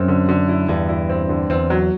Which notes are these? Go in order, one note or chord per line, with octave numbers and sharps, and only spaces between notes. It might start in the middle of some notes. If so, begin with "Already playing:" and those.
Already playing: F#2 C4
D3
D3
E4
E2 G2 D3
E4
C4
D3
E2 C4
F#3